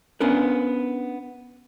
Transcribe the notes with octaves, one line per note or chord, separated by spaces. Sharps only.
B3 C#4 D4 A#4 B4